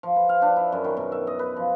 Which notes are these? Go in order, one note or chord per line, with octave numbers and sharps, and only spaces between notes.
F3
B4
F5
D4
E4
F#2
D#3
B2
E5
D#5
B4
F3